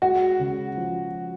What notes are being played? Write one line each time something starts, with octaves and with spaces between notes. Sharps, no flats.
G#3 F#4
C#3
F3